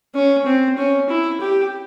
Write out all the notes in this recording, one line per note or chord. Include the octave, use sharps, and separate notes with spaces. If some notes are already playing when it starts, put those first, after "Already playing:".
C#4
C4
C#4
E4
G4